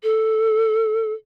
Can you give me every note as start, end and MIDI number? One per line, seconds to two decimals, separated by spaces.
0.03 1.13 69